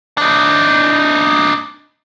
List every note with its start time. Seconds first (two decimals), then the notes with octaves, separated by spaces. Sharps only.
0.18 D4 D#4